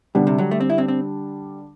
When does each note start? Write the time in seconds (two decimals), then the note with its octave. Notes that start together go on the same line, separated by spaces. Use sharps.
0.15 B2 D3 G3 D4
0.27 C3
0.38 F#3
0.51 A3
0.60 C4
0.70 E4
0.78 C4
0.88 C4